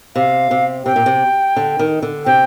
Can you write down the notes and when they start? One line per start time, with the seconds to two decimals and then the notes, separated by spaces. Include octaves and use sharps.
0.16 C3 F5
0.51 C3
0.85 C3 G5
0.96 A#2
1.06 C3
1.56 D3
1.79 D#3
2.02 D3
2.26 C3 G5